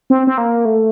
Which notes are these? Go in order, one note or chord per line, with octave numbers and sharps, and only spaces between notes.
C4
C4
A#3
A3